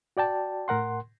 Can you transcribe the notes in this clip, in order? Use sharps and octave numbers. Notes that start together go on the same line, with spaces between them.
F#4 D5 G5 A5
A2 A#4 F#5 C6